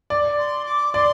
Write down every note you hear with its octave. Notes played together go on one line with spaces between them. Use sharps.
D5
C6
D6
D5 C6